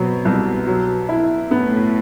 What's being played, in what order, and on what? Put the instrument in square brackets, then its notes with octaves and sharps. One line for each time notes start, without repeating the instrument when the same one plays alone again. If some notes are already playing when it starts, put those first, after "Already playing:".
Already playing: [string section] B2 [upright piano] F#3 C4
[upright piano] C2
F#3
E4
[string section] A2 [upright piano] B3